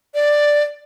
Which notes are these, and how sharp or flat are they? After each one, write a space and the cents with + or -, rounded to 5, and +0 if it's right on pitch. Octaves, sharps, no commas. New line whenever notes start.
D5 +5